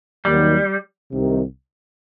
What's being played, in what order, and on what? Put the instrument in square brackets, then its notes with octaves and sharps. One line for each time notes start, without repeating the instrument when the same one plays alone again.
[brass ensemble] D#2 D#3 F#3 [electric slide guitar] G3
[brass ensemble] C2 C3 D#3